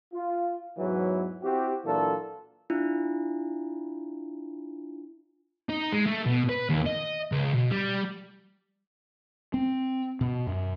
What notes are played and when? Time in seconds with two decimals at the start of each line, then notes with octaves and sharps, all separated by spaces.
0.13 F4
0.77 E2 G#2 E3 F#3
1.42 C4 E4 F#4 G4
1.85 A#2 E3 F#3 D4 F4 A4
2.70 D4 E4 F4
5.69 D#4
5.92 G#3
6.06 A3
6.26 B2
6.49 B4
6.69 D#2
6.86 D#5
7.32 C#2
7.54 B2
7.71 G3
9.54 C4
10.21 B2
10.47 F#2